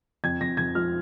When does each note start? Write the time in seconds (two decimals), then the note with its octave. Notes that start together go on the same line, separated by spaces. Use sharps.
0.24 F2 G#6
0.40 F2 A#6
0.57 F2 G#6
0.75 F3 F6